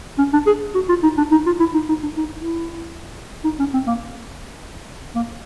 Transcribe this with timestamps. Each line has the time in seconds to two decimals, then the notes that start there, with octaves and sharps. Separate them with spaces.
0.18 C#4
0.33 D4
0.47 G#4
0.75 F#4
0.89 F4
1.03 D#4
1.17 D4
1.31 D#4
1.46 F4
1.60 E4
1.74 D#4
1.89 D#4
2.03 D4
2.17 D#4
2.38 E4
3.44 D#4
3.59 C#4
3.74 C4
3.87 A#3
5.15 A#3